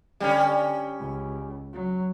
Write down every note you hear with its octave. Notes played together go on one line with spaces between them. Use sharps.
D3 G3 C#4
C#2
F#3